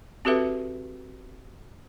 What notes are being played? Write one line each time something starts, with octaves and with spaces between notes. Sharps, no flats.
C4 F#4 G4 A4 B4 E5